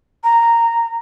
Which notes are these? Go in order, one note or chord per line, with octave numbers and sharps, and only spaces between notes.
A#5